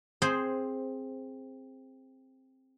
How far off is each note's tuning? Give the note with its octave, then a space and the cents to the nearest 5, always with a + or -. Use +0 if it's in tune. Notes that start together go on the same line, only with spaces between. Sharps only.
C4 +10 G#4 +0 C5 +0